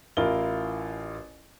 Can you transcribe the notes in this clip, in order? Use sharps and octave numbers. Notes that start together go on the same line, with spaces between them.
A1 E4 F4 A#4 G7